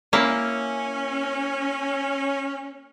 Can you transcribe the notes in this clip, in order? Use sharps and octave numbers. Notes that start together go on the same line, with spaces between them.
A#3 C#4 E4